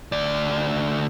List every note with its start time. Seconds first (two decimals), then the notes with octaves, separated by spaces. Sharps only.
0.12 D2 D5